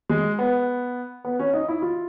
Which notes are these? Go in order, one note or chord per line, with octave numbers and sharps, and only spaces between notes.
G#3
B3
B3
C#4
D#4
E4
F4